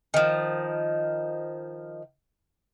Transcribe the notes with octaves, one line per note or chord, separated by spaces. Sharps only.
D#3 F3